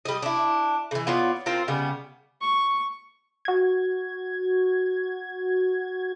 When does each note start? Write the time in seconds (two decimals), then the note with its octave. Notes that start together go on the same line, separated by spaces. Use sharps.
0.05 G3 D#5
0.22 D4 E4
0.91 C#3 E3
1.07 B3 F4 C#5 D5
1.46 C4 F4 A#4 C5
1.68 C#3 G3 B3
2.41 C#6
3.45 F#4 G#6